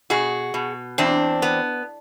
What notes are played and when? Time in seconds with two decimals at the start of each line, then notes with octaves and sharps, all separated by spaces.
0.10 B2 F#4 G#4
0.54 B2
0.98 E2 C4 D4
1.42 B3